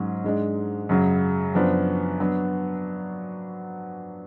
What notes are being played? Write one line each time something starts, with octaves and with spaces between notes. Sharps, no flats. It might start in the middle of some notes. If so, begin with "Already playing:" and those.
Already playing: G#2 F#3 C#4
G#2 G#3 D4
F#2 C#3 F#3
F#2 F3 B3 D4
F#3 B3 D4